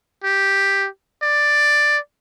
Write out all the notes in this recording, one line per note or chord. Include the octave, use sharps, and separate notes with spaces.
G4
D5